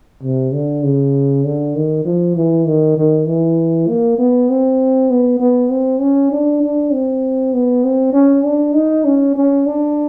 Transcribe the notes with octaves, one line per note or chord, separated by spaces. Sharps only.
C3
D3
C#3
D3
D#3
F3
E3
D#3
D#3
E3
A#3
B3
C4
B3
B3
C4
C#4
D4
D4
C4
B3
C4
C#4
D4
D#4
C#4
C#4
D4